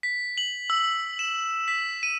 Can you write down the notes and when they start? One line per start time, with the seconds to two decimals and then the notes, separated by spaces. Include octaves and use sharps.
0.03 B6
0.38 F#7
0.70 E6
1.19 E7
1.68 B6
2.03 D#7